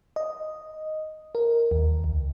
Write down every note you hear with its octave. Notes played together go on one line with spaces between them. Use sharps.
D#5
A#4
D#2
C#2